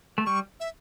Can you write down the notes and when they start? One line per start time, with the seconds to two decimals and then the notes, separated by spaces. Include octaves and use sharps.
0.18 A3
0.26 G3 C#6
0.60 E5